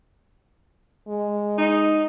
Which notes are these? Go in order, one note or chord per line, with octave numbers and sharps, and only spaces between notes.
G#3
D#4